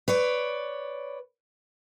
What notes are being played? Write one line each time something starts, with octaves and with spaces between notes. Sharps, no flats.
B4 C#5 D5